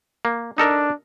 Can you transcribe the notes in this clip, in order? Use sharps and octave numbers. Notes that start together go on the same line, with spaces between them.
A#3
D4 D#4 A4 A#4